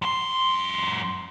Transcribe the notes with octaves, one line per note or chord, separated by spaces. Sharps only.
F#2 C6